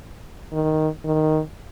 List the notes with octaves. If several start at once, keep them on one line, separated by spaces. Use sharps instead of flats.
D#3
D#3